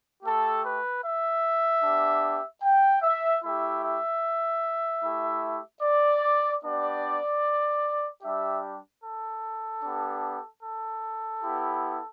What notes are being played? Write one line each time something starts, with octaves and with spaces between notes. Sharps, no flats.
A3 G4 A4
B4
E5
B3 D4 G4
G5
E5
A3 E4 G4 E5
E5
A3 E4 G4
D5
B3 D4 G4 D5
G3 D4 G4 E5
A4
B3 D4 G4
A4
B3 E4 G4